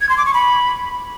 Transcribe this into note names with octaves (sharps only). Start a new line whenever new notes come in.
G#6
C6
D6
C#6
B5